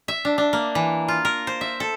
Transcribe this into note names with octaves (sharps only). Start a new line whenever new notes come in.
E5
D4
D4
A#3
E3
F4
A#4
C5
E5
A4